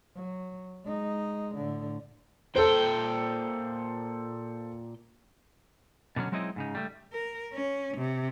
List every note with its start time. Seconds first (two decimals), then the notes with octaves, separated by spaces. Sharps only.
0.15 F#3
0.85 G#3 D#4
1.55 A2 D3
2.56 A#2 A4 C5 G5
6.16 B2 D3 F#3 C#4
6.32 F#3 G#3 C4 D#4 E4 D#5
6.56 G#2 C#3 D#4
6.75 G3 A3
7.13 A#4
7.53 C#4
7.97 C3